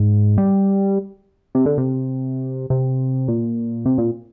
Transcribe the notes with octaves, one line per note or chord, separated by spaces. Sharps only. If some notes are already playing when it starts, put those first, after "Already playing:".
Already playing: G#2
G3
C3
D3
C3
C3
A#2
C3
A#2